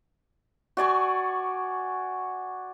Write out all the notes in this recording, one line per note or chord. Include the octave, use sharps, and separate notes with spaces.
F#4 D5 G#5 C#6